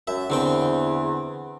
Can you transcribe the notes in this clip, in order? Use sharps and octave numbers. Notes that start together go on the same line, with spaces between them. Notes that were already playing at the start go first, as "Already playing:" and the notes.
F#2 E5
E2 D3 C4 G5